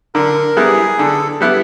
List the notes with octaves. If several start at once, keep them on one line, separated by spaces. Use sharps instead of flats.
D3 A#4
G3 B3 E4 G#4
D3 A4
G3 B3 E4